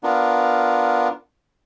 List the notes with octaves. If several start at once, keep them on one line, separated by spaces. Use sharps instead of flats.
B3 D4 F4 A#4